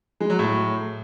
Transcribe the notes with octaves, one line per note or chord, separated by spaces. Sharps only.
G#3
F#3
A2